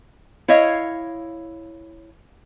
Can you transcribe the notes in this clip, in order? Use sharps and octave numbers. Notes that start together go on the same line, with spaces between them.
E4 C#5 D#5 F5